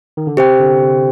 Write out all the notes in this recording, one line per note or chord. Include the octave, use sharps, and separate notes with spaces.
D#3
D3
C3 G4 C5 G5
D3
C3